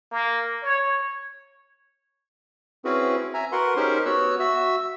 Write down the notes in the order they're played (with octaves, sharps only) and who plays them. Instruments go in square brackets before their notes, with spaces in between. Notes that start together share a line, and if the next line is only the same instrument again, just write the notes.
[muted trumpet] A#3
C#5
[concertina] C4 C#4 E4 F#4 G#4 B4
E5 G#5 A#5
F#4 A#4 B4 F#5 C6
C#4 D#4 G4 G#4 A#4 C5
B3 F#4 C#5 E6 F#6
F#4 E5 E6